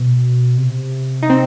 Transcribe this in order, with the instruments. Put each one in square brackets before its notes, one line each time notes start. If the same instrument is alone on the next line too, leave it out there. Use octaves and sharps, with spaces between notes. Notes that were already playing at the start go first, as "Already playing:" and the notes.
Already playing: [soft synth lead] B2
C3
[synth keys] D#4
C4